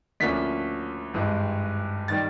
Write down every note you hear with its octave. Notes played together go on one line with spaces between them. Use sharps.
D2 D3 F3 A#3 C#4 B6
G#1 G2 E3 G#3
D#3 G3 A6